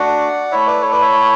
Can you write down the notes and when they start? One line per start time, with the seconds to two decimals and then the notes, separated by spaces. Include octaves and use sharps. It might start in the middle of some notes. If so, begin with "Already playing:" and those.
Already playing: A3 D4 F#4 D5 F#5
0.51 A3 E4 C#5 E5
0.67 B4 D5
0.81 A4 C#5
0.91 B4 D5
1.01 C#5 E5